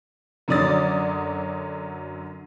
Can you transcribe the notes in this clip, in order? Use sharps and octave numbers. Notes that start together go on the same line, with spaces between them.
F#2 D3 F#3 D5 D#6 A6